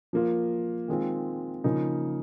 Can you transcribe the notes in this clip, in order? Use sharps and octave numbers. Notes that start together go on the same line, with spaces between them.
F3 A#3 F4
D#3 G#3 C4 F4
C#3 F3 A#3 D#4